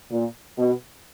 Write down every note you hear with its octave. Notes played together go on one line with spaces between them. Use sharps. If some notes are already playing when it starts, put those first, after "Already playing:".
A#2
B2